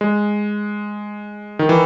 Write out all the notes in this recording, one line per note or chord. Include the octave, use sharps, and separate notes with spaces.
G#3
D#3
E3